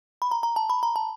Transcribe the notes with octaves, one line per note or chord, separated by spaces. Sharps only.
B5
A#5
A#5
A5
B5
A#5
A5